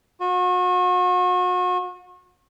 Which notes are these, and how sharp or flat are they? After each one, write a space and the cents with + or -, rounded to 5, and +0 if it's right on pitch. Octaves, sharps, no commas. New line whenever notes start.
F#4 -35